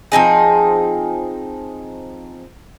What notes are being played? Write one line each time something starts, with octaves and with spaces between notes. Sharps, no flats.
F3 C4 D#4 G#4